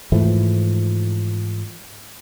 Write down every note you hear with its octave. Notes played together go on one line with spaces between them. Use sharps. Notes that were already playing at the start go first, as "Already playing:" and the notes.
G#2 E3 F3 A3